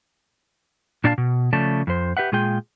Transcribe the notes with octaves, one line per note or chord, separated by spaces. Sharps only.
A#2 D4 D5 F5 G#5 A5
B2
C#3 F3 A3 D5 A5
F2 C5
G4 B4 E5 F#5
A#2 G#3 F4 G#4 G5